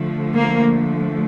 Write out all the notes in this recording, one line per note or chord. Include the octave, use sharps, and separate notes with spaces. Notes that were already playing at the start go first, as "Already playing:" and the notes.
Already playing: D3 F3 A3
A#3